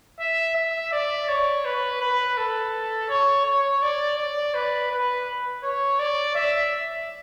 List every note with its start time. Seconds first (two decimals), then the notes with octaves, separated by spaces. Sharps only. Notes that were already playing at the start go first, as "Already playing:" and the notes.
0.20 E5
0.56 E5
0.92 D5
1.28 C#5
1.65 B4
2.01 B4
2.38 A4
3.09 C#5
3.46 C#5
3.82 D5
4.18 D5
4.54 B4
4.91 B4
5.63 C#5
5.99 D5
6.35 E5